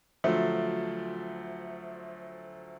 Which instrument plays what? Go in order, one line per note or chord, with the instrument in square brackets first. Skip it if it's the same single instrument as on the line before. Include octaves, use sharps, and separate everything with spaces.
[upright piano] D2 F3 F#3 A3